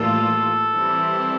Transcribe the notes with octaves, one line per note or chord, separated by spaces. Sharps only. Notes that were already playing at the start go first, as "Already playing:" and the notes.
Already playing: A2 E3 G3 A#3 F4 A4
E3 G3 C4 E4